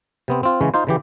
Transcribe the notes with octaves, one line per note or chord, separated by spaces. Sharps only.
C3 B3 C4
C4 F4
C#3 E3 G#3 C#4
D#4 F4 C5
C#3 E3 G4